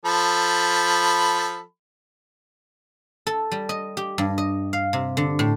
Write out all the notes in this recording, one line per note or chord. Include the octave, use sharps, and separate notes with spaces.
F3 A4 B5
A4
G3
D#5
G4
G2
D#5
F5
C3
D3
A2